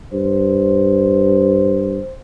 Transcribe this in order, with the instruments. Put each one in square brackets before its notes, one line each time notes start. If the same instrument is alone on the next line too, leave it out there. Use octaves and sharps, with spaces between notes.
[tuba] G2 [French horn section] C5